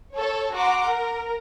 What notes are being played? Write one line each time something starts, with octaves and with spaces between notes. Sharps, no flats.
A4 C#5
F#4 F#5 A#5 C6 D6
A#4